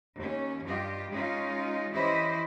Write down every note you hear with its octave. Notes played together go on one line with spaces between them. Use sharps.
D#2 C#4
G2 F4 G4 D#5
G#3 C#4 D#4 F4
E3 C#4 E4 G4 C5 D#5